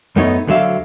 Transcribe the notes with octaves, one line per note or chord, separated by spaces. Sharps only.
F#2 A3 B3 D#4 C#5
D2 D3 F#3 E5 F5